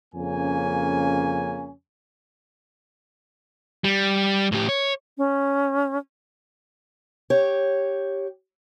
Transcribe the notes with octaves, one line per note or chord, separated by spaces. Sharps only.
F2 C#3 A#3 C#4 G#5
G3
A2 G4
C#5
C#4
G4 C#5